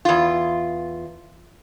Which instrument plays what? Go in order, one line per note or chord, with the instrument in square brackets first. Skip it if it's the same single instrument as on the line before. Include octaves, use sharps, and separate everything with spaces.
[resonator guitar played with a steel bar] E2 F4